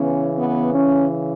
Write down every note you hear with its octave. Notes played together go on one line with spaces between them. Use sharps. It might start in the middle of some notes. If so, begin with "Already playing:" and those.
Already playing: C#3 E3 B3 C#4
B3
C#4